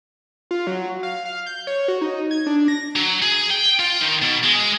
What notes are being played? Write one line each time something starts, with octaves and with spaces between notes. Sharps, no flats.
F4
F#3
F5
F5
G6
C#5
F#4
D#4
G#6
D4
A#6
F#3
G#4
G5
F4
D#3
B2
G#3
G#3